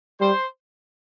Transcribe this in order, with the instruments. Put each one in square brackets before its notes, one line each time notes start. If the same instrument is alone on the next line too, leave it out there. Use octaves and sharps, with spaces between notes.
[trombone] G3 [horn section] C5